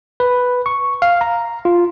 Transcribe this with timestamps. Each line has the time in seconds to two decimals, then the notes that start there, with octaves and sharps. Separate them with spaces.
0.20 B4
0.66 C#6
1.02 F5
1.21 A#5
1.65 F4